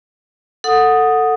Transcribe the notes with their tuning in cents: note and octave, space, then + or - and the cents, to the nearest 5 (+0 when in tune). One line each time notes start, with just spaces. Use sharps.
A4 +15 F#5 -15 D#6 +0